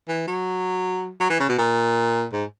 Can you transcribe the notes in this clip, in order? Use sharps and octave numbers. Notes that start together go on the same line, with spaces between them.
E3
F#3
F#3
E3
C#3
B2
A#2
G#2